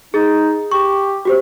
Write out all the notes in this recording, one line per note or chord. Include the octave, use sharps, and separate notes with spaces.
D#4 G#4 A6
G4 C#6
F#4 G4 C5